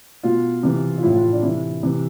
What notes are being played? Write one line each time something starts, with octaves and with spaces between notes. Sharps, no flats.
B2 F4
C3 E3
F4
A2 F3 E4
F4
E4
D4
C3 E3 E4
C3 E3